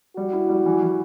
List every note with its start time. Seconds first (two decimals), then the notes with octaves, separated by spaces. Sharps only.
0.17 G3 F#4
0.33 E4
0.49 G3
0.66 E3
0.82 E3